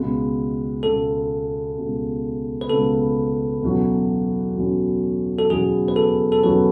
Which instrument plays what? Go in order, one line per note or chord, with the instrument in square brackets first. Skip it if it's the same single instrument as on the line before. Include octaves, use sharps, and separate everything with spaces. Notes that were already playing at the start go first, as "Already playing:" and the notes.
Already playing: [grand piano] C#2 B2 G#3 B3
[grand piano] C#2 B2 G#3 B3 [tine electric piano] A4
[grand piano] C#2 B2 G#3 B3
[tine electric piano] B4
[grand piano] C#2 B2 G#3 B3 [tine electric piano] A4
[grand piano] E2 B2 F#3 C#4 F#4
E2 B2 F#3 C#4 F#4
[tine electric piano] A4
[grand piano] E2 B2 F#3 C#4 F#4 [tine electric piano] G#4
[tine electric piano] B4
A4
A4
[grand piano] E2 B2 F#3 C#4 F#4 [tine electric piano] B4